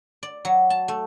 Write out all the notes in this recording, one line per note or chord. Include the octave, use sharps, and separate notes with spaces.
D5
F#3
A5
A3